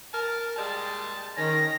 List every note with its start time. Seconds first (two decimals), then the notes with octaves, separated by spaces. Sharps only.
0.13 A#4 A5
0.57 A#2 G3 G#3 A5
1.36 D#3 C#4 A#6